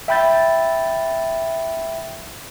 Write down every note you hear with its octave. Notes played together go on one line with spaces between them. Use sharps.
E5 G5 B5 G6 A6